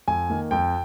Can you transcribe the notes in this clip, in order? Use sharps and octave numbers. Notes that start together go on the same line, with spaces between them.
F2 G#5
D#3 A#3
F2 G5